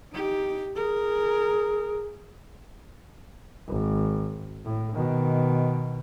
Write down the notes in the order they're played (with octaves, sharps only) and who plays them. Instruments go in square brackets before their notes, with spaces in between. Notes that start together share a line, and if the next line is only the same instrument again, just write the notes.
[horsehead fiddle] D#4 G4
[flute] G#4 [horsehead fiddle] A#4
[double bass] G#1
A2
B2 D#3